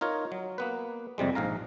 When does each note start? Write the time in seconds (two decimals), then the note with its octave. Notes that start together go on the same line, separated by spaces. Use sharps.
0.01 D#4 F4 A#4 C#5
0.32 F#3
0.58 A#3 B3 B4
1.18 F2 C3 G3 G#3
1.35 A#1 G#2 F5 A#5